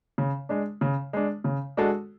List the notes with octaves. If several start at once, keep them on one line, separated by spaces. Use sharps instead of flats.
C#3
G#3 D4
C#3
G#3 D4
C#3
G#3 D4 F#4 A4